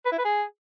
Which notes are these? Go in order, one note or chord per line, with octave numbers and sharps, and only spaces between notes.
B4
E4
B4
G#4